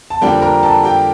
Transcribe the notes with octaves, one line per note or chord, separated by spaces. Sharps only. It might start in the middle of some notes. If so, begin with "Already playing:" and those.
A5
F2 D3 G3 A#3 D4 G4 G5
A#4 A#5
A4 A5
G4 G5